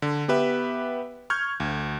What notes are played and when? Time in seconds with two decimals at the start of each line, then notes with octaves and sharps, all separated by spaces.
0.02 D3
0.28 B3 G4 B4 E5
1.30 C#6 F6 G6 G#6
1.60 D2